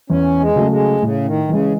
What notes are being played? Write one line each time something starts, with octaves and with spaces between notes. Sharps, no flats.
E2 C#4
G#3
C#3 F#3 A3
G#3
A2 C#3
D#3
C#3 E3 G#3